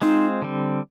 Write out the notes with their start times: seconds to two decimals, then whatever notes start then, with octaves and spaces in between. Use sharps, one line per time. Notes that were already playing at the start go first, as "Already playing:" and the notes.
0.02 G#3 C4 D#4 F4 C5
0.42 D3 G3 C4